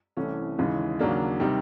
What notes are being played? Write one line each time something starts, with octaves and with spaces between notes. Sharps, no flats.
C2 C3 E3 A3 C#4
D#2 C#3 E3 G#3
D#2 C#3 F#3 A#3 D4
C3 D#3 G3